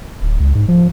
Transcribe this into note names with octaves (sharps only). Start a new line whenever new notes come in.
D1
C#2
G#2
F3